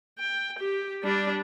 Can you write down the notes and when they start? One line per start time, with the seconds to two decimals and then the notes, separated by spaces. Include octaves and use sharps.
0.19 G5
0.59 G4
1.03 G3 D4